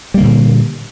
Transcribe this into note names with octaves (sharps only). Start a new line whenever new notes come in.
A#2 D3 G3 A#3